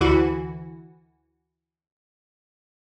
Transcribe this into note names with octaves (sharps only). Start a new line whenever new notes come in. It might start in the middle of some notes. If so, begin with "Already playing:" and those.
D2 E3 F#4